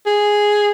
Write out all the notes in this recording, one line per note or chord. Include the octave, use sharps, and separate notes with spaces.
G#4